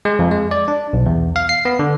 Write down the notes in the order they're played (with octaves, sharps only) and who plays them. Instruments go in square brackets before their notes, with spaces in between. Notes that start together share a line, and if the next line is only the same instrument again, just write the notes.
[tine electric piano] G#3
F2
G#3
D5
D4
B1
E2
F5
C7
B3
D3